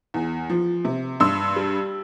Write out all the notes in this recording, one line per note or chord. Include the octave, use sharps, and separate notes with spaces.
E2
F3
C3
G2 C6 E6
G3